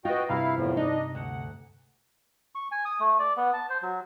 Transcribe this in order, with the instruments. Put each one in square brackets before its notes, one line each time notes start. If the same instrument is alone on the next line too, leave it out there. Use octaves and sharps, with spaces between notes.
[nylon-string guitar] F4 B4 [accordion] F#4 D#5 G5
[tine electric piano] G2 C3 A#5 [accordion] E4 F5
[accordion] E2 A2 F3
[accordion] D4 D#5 [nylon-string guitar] D#4
[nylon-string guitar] D2 [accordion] F#5
[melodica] C#6
G#5
D#6
A3
D5
B3
A5
C5
F#3